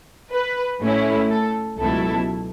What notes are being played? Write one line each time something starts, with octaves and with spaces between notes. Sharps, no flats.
B4
A2 A3 C#4 E4
A4
C#2 B2 F#3 A3 E4 A4